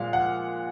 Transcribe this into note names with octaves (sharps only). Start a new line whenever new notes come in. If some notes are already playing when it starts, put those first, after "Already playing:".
Already playing: A#2 F3 G#3 F5
F#5